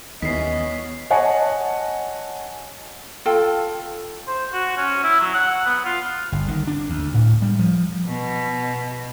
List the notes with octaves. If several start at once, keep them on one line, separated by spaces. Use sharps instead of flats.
D#2 E3 B3 C#4 D#5 B6 C7
C#5 D#5 F#5 G#5 A5
F4 A4 G5
C5
F#4
C#4
E4
F#3
F#5
B3
F4
G1
D#3
D4
D2
A2
G3
F3
B2